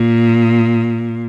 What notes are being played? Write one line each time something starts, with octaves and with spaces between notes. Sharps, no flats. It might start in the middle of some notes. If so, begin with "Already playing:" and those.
Already playing: A#2